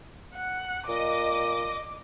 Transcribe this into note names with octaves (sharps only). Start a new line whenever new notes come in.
F#5
A#2 D#5 D6